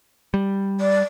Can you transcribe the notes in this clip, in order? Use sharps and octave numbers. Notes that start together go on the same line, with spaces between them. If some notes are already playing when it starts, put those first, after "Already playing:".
G3
D5